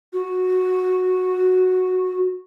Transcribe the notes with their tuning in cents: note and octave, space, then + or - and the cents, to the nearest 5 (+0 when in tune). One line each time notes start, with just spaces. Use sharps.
F#4 -5